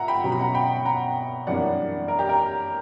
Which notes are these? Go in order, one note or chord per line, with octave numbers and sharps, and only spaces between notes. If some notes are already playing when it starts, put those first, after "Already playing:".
Already playing: A#2 E5 F#5 A#5
G5 B5
B2 F#3 C#4 A#5
B5
F#5 A#5
G5 B5
F#5 A#5
F#2 E3 G3 A#3 D4 D5 F#5
A#4
G4
A#4